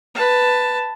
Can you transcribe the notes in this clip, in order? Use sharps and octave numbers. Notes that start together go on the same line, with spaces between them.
B4 A5